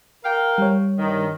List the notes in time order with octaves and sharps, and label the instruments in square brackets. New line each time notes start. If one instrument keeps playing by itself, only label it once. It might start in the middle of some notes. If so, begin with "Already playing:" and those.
[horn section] A#4 F5 G5
[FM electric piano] G3 C#5
[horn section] G2 D#3